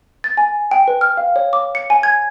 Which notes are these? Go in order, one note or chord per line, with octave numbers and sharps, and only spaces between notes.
A6
G#5
G5
B4
F6
F5
C#5
D6
C#7
G#5
G#6